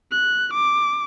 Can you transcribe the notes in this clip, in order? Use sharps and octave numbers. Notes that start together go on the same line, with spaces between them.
F#6
D6